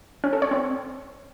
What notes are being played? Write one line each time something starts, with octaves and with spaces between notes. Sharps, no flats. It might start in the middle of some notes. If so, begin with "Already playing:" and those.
C#4
A4
C#5
C4